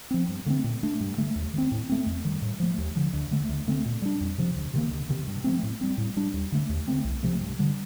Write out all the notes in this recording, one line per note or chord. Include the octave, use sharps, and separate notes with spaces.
F3 C4
G2
D3 A3 C4
A#2
A3 D4
G2
D3 A3
D#2
D#3 G3 C4
A2
A3 C4
F2
D#3 G3
A2
F3 A3
D#2
D3 F3
D2
D3 A3
D2
D3 A3 C4
A#2
G3 D4
F2
C3 F3
D2
C3 D#3 A#3
D2
C3 D#3
G2
F3 A3 C4
A2
G3 C4
A2
G3 D4
D#2
D3 A3
D#2
D3 A3 C4
C2
C3 F3 A3
G2
D3 G3